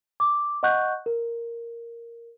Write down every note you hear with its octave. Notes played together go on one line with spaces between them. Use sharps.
D6
D#5 F#5 C#6 F#6 G6
A#4